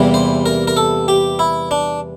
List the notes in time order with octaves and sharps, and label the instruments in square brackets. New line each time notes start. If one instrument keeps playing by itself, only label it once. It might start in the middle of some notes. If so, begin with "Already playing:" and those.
Already playing: [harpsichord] E2 C3 E3 G3 A#3
C5
A#4
A#4
A4
G4
E4
D4